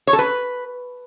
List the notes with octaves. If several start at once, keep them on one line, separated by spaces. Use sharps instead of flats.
C#5
A4
B4